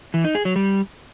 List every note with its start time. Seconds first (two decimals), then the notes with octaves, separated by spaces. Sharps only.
0.14 E3
0.24 D#4
0.35 G#4
0.45 F#3
0.56 G3